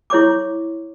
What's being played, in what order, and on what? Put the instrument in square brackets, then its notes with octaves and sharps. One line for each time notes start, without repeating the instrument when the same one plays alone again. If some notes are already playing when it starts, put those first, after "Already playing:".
[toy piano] E4 C#5 C#6 D6